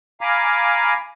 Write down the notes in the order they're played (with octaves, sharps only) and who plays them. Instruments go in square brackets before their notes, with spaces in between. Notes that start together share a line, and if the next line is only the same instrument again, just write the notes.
[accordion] F5 G#5 A#5 B5 D6